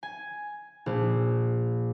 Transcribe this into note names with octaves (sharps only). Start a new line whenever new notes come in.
G#5
A#1